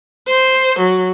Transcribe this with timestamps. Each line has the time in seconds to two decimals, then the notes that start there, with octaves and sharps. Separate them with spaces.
0.28 C5
0.79 F#3